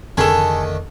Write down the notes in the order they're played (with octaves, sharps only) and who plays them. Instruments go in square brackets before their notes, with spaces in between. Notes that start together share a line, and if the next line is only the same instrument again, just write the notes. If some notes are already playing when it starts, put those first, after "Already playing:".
[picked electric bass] F1 [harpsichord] D3 D#3 A3 [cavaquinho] G#4 A4